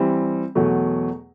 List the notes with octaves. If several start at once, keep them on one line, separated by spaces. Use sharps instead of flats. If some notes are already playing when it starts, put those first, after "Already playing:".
Already playing: E3 G3 C4
E2 B2 F#3 A3